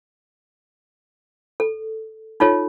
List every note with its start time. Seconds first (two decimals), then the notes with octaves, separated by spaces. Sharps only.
1.60 A4
2.40 D#4 F4 A4 C#5